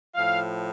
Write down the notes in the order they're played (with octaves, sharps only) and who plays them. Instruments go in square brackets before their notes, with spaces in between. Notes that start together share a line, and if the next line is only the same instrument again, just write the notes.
[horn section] A2 F3 F5